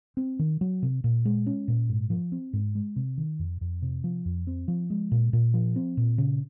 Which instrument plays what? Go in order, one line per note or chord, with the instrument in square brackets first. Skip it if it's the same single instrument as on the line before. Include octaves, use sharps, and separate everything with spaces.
[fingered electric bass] C4
D#3
F#3
C3
A#2
G#3
C#4
A#2
G#2
F3
C4
G#2
G#3
C3
D#3
F2
F2
C3
F3
F2
C4
F3
G#3
A#2
A#2
F3
C4
A#2
C#3